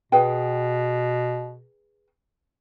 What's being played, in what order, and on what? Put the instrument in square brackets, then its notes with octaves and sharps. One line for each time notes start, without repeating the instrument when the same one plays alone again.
[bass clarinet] B2 [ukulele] G#4 B4 G5